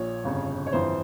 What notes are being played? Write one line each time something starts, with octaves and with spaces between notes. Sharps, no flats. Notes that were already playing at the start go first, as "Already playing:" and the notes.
Already playing: A#1 A#2 F3 C#5
G1 F2 C#3
C#5
G1 F2 E3 C5